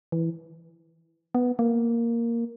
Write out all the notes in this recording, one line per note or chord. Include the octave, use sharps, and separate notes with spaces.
E3
B3
A#3